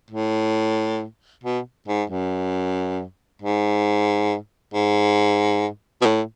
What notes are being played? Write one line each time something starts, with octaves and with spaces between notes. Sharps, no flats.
A2
B2
G#2
F#2
G#2
G#2
B2
A2